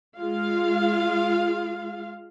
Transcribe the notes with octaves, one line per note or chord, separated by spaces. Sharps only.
G#3 F4 F5